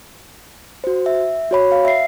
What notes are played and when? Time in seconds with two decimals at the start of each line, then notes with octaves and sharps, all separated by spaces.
0.84 F#4 C5
1.06 E5
1.51 F#4 C#5 B5
1.72 F5
1.85 E5 C7